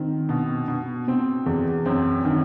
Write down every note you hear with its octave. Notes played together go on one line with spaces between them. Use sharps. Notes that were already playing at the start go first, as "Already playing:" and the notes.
Already playing: D#3 C4
B2
B2
B2 C4
E2
F#2 C4
D#3